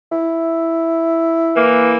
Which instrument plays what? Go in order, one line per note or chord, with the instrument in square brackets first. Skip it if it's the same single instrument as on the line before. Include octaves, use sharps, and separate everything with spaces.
[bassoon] E4
[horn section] E3 A#3